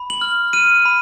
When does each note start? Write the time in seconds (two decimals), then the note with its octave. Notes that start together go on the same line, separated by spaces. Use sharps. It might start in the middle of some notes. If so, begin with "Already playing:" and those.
Already playing: B5
0.10 F#7
0.21 F6
0.53 F6 D#7
0.85 B5